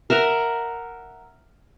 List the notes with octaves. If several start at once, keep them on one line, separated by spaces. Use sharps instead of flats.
A#4 E5 F#5 A#5